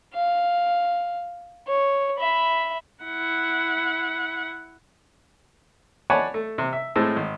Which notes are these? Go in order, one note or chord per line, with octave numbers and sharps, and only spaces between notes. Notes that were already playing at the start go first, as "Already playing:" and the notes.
F5
C#5
E5 B5
E4 F#5
C#5 D5 F#5 G#5 A5 B5
A3
C3
E5
A2 G#3 C4 A5 E6
G#1